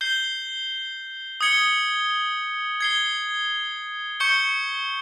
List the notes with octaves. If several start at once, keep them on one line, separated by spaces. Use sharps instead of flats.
G6 C7 G7
D#6 G#6 C#7 G7
G#6 C7 G7
C#6 G6 C#7 G7